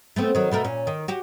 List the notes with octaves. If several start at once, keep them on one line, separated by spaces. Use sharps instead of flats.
A3 B3 C4
D#3 F#3
B2 A3 A#4
A#2 C#4
D#3
F#4 G4